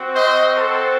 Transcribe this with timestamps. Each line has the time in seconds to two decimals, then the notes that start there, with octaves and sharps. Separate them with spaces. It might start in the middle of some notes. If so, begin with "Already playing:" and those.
Already playing: C4 F#4
0.15 C5 D#5
0.57 A4 C5